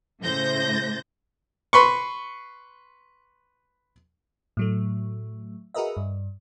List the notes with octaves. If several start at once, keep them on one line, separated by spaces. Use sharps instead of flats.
A2 C#3 C5 G6 A#6
B4 C6 C#6
A2 F#3 A3
F#4 G#4 A#4 B4 D#5 E5
G2